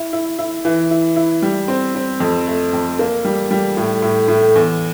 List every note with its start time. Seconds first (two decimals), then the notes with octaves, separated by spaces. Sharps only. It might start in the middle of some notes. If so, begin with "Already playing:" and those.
Already playing: E4
0.13 E4
0.39 E4
0.65 E3
0.91 E4
1.16 E4
1.42 G3
1.68 C4
1.95 C4
2.20 F2
2.47 A3
2.73 F2
2.99 A#3
3.25 G3
3.51 G3
3.77 A2
4.02 A2
4.28 A2
4.55 E2